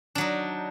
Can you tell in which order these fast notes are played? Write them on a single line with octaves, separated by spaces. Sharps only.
D4 F#3 D#4